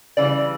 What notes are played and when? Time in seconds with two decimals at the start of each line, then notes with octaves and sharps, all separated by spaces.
0.17 C#3 E3 G3 D5